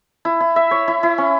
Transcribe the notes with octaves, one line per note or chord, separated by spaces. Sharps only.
E4
E4
E5
C#5
E4
E4
C#4